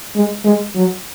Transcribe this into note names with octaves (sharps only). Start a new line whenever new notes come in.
G#3
G#3
F#3